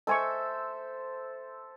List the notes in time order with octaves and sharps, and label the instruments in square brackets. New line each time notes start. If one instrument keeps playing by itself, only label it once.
[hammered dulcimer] A4 C5 E5 [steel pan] D#5 G#5 C#6